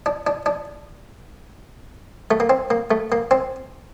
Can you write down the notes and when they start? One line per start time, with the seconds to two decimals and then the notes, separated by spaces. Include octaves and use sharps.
0.06 D4
0.27 D4
0.46 D4
2.31 A3
2.40 A#3
2.50 C4
2.70 A#3
2.91 A3
3.12 A#3
3.31 C4